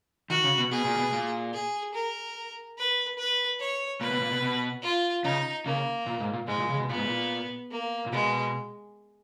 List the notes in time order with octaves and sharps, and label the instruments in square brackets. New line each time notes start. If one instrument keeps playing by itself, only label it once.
[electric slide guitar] D#3 [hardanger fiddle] F#4
[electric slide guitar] C#3
B2
[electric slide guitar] B2 [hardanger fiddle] G#4
[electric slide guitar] A#2
B2
A#2
[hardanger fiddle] G#4
A#4
B4
B4
C#5
[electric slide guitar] A#2 [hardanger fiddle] B4
[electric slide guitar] B2
A#2
B2
B2
[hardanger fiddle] F4
[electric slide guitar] C#3 [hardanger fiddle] D#4
[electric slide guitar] C#3 [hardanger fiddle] A#3
[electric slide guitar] A#2
G#2
A#2
[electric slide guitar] G#2 [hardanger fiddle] G#3
[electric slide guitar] A#2
C#3
B2
[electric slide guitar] A#2 [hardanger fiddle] B3
[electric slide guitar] G#2
A#2
[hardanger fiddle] A#3
[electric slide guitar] A#2
[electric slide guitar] B2 [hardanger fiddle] G#3